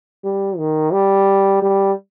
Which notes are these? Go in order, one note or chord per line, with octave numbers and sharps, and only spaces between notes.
G3
D#3
G3
G3